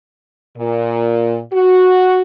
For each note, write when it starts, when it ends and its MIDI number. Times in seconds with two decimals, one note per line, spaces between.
0.57 1.39 46
1.52 2.21 66